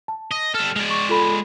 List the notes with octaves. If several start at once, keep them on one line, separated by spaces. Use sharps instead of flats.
A5
D#5
G3 A4 F6
G#3 D5
C#6
F4 A4 B5